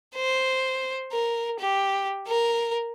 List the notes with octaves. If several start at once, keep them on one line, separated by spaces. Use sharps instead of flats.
C5
A#4
G4
A#4